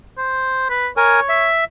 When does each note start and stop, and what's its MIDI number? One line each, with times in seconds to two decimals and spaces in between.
0.18 0.70 72
0.70 0.88 71
0.97 1.20 70
0.97 1.47 73
0.97 1.20 80
1.29 1.64 76